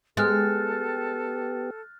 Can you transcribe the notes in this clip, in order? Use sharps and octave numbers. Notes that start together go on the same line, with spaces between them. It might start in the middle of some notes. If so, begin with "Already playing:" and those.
G#3 B3 G4 A4 F6 F#6 A6